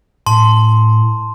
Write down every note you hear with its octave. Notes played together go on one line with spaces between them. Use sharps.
A2 A5 C6